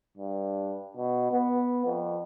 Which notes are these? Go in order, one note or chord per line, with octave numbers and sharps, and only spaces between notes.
G2
B2
B3
F2